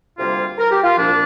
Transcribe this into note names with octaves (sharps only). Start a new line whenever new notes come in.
D2 C3 G3 A#3 F4
A#4
G4
F4
C2 A#2 F3 D4